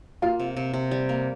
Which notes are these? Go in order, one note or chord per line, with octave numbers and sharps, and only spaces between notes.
A#3 F4
C3
C3
C3
G3
A#3